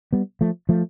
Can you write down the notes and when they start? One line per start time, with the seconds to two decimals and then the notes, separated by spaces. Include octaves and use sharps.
0.13 G3 B3
0.41 F3 A3
0.69 F3 A3